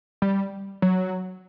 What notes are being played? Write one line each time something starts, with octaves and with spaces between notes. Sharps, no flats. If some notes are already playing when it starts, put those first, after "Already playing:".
G3
F#3